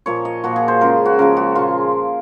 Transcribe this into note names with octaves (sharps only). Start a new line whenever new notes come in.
A#2 F3 A#3 C#5
D#5
A#2 F3 A#3 F#4
G#4
C5
C#3 F3 G#3 A#4
F#4
C#3 F3 G#3 A#4
F#4
A#2 G#3 F4